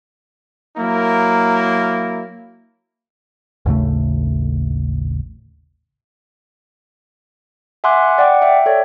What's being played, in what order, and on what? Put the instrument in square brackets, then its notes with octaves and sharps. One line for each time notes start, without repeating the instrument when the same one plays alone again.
[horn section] F#3 A#3 E4 A#4
[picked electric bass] A1 D#2 C#3 A3
[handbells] E5 F#5 G#5 C6 D6 F#6
D5 F#5 G5 D6
E5 G5
A4 C#5 D5